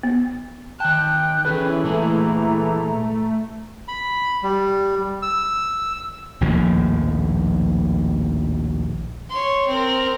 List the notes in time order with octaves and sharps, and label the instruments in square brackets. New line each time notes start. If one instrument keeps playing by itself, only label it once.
[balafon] B3
[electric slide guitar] D#3 A5 [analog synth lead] G5 [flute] F#6
[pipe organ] E3 [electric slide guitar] C#4 G#4 A4 [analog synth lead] B4
[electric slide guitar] A#2 G#3 G#4 [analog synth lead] A3 [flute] A#5
[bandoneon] B5
G3
E6
[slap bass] A#1 D#2 A2 F3
[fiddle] C#5 C6
C4 A#4